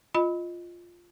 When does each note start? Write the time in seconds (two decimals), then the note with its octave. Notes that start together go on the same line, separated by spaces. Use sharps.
0.14 F4 D#5 B5